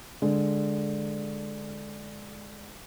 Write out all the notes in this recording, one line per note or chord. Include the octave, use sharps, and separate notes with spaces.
D3 G#3